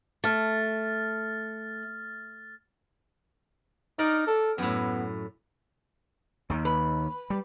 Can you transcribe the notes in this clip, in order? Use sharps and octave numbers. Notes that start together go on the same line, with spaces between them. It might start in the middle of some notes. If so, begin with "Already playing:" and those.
A3 F6 A6
D#4 A#4 D5
A4
F#2 A2 B3
D#2 D#3
B4
G3